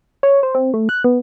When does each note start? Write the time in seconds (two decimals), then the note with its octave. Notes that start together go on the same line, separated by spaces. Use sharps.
0.23 C#5
0.43 C5
0.55 C4
0.74 A3
0.89 F#6
1.04 B3